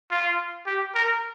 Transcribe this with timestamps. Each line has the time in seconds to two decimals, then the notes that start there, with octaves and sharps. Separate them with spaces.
0.10 F4
0.66 G4
0.95 A#4